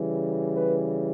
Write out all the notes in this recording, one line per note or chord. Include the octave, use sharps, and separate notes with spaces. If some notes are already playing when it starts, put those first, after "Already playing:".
Already playing: C#3 E3 G3
B4